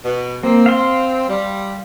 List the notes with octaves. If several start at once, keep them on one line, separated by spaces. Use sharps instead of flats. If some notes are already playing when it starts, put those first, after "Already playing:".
B2
A#3 C4
F5 C6
G3